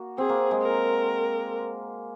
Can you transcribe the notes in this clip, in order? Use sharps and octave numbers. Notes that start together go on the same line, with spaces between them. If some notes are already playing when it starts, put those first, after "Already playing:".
Already playing: A#3 F#4
C4 G#4
A#3
G#3
A#4